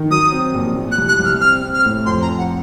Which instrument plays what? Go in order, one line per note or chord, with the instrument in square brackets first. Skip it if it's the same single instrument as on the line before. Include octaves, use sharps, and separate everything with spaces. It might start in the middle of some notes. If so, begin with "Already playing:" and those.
Already playing: [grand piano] D#3
[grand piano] F#3 [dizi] D#6
[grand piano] C4
A#1
A#2
[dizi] F#6
[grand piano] C2
[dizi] F#6
[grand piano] C2
[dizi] F6
[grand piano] C4 [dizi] F6
[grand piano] C4
[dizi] F6
[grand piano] A2
[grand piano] F2 [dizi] C6
[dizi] A#5
[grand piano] F2
[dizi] F#5